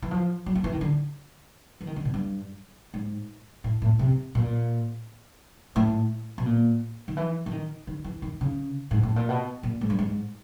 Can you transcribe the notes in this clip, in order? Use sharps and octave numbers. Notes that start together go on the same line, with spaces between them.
E3
F3
F#3
F3
E3
D#3
D3
E3
D#3
D3
B2
G2
G#2
A2
A2
C3
A#2
A2
B2
A#2
D#3
E3
E3
D#3
D#3
E3
D#3
C#3
G#2
A2
A#2
B2
A#2
G#2
G2
G#2